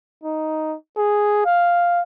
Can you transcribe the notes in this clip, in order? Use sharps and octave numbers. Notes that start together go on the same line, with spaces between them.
D#4
G#4
F5